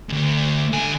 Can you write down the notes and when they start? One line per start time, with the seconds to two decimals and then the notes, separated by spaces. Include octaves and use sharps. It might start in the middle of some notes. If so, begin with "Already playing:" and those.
0.09 D2 G#2
0.72 D3 G#5